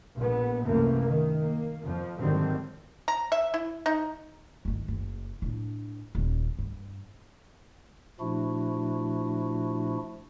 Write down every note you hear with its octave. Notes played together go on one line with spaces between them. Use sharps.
A#1 B3
C2 F#2 C3 E3 A3 A#3
D#3
A#3
F2 F3
G#1 D3 D#3 F#3 G3 C4
A#5
E5
E4
D#4
G1 D#3
F#1
A2 D4
D#1 C#4
G2
A#2 F3 A3 D4 E4 F#4